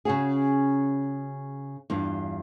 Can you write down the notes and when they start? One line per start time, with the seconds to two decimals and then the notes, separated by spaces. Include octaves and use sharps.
0.05 C#3 C#4 F#4 G#4
1.90 E2 G2 F4